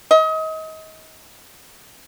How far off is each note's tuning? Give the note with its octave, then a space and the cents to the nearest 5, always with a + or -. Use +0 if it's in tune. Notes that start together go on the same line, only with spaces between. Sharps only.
D#5 +30